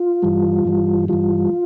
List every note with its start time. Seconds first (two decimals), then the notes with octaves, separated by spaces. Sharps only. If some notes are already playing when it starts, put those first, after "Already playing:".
Already playing: F4
0.22 G2 E3 G3
0.65 G2 E3 G3
1.08 G2 E3 G3 F4